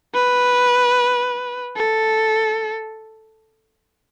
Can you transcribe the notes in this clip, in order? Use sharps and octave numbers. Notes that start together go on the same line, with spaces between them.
B4
A4